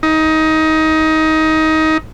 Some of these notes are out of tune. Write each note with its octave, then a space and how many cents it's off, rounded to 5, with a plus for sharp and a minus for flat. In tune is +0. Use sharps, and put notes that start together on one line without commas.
D#4 +20